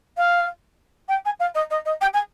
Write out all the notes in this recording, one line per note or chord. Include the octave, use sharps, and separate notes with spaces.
F5
G5
G#5
F5
D#5
D#5
D#5
G5
G#5